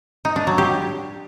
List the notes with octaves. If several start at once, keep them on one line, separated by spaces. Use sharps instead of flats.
D#4
D4
F#3
G4